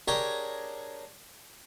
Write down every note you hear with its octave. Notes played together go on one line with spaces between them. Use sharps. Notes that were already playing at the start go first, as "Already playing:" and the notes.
D4 G4 G#4 A#4 C#5 D#5